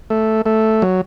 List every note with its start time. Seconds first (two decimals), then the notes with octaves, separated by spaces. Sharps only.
0.10 A3
0.46 A3
0.82 F#3